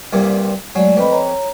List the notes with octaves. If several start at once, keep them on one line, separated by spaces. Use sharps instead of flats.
C2 G2 A#2
F#3 G#3 A3 D5
F2 B4 D#5 B5
C#5 A#5